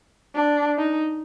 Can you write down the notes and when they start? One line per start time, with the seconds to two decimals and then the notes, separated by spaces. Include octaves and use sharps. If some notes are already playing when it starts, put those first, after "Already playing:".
0.35 D4
0.77 D#4